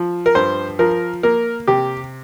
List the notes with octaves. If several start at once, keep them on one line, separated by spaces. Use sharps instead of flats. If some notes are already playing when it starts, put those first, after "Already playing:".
Already playing: F3
A#4
G2 C5
F3 A#4
A#3 A#4
C3 G4